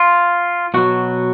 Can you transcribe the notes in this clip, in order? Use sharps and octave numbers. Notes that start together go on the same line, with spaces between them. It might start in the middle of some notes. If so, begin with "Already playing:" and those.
Already playing: F4
B2 F#3 F#4